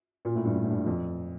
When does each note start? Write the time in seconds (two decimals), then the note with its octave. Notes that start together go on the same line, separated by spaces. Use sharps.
0.25 A#2
0.35 A2
0.45 G2
0.55 G2
0.64 A2
0.70 G2
0.86 F2